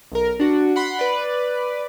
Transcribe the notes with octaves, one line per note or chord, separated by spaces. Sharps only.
B1 A#4
D4 F#4
F#5 B5 C6
B4 D5